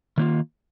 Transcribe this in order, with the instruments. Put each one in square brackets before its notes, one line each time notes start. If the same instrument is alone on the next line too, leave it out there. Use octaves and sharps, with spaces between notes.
[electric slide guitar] D#3 A#3 F4